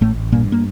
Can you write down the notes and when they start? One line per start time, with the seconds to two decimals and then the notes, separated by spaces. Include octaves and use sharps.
0.01 A1 A2 A3
0.32 G2 A#2 A#3
0.52 A#3